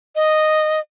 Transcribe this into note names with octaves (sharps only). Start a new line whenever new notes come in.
D#5